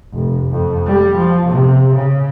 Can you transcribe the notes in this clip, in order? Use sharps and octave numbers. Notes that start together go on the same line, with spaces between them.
F1
F2
G3
F3
C3
C#3